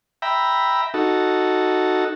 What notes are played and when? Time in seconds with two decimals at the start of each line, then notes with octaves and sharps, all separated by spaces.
0.22 E5 G5 A#5 B5
0.94 D#4 F#4 A4